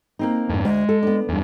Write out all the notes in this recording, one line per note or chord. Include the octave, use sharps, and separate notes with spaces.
A#3 C4 D#4
F2 G#2
D2 G#3
A4
B3 D4
E2 G2